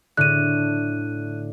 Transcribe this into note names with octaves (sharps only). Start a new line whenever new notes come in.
A2 D3 F#6 D#7